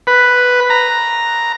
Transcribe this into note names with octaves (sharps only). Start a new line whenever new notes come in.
B4
A#5